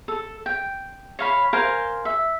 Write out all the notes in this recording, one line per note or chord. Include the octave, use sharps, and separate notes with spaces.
A4
G5
C#5 F5 B5
A#4 C5 F5 G#5
E5